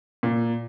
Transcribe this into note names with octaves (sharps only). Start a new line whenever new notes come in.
A#2